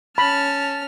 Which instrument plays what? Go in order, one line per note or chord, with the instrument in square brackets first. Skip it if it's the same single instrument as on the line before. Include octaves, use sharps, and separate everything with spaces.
[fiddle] C#4 F6 [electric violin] A5 [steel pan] B5